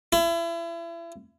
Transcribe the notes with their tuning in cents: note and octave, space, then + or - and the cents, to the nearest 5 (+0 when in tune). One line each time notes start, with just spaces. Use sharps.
E4 +35